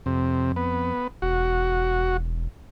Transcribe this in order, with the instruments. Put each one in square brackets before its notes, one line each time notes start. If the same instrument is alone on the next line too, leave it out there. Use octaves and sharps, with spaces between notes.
[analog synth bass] F2 [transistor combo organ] C3
[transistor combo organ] B3
[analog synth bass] E1 [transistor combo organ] F#4